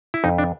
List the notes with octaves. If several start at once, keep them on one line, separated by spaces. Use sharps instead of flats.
E4
F2 D#4
D4